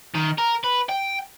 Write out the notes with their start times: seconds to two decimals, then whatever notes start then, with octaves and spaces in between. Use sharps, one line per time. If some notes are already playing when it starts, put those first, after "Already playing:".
0.15 D#3
0.38 A#4
0.64 B4
0.89 G5